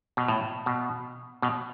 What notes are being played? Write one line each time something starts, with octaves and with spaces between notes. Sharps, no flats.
B2
A2
B2
B2